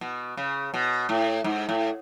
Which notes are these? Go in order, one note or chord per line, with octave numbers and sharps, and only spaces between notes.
B2
C#3
B2
A2
G#2
A2